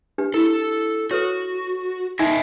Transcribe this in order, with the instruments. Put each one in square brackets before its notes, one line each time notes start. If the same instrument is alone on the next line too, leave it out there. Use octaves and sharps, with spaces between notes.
[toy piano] D4 G4 B4
[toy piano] E4 [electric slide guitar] A4
[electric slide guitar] F#4 [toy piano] A4 B4 C#5
[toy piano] D#4 [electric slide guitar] D#5 E5 G#5